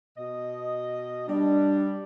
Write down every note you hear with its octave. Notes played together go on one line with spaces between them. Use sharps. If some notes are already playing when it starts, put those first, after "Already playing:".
B2 D#5
G3 D4